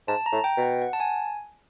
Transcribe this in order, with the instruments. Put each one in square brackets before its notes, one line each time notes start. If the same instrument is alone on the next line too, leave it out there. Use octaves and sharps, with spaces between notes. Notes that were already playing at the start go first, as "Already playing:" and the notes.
[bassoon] G#2 [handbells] A5
[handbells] A#5
[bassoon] A2
[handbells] G5
[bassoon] B2
[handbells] F#5
F#5
A5
G#5